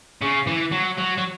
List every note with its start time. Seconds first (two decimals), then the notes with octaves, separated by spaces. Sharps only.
0.22 C#3
0.47 E3
0.72 F#3
0.98 F#3
1.18 F#3